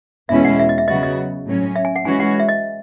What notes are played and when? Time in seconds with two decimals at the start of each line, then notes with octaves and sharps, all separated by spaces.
0.29 E2 B2 G#3 C#4 E4 E5
0.45 F#5
0.59 E5
0.69 D#5
0.78 E5
0.88 C#3 F#3 B3 F#4 D#5
1.03 D#5
1.46 A2 F#3 C#4
1.76 E5
1.85 G#5
1.96 F#5
2.05 E3 G#3 C#4 F#4 G#5
2.20 F#5
2.40 E5
2.49 D#5